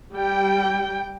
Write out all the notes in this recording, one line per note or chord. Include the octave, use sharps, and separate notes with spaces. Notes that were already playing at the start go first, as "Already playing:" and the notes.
G3 G5